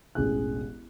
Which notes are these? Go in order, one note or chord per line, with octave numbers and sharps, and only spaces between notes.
E1 A1 G#4 F#6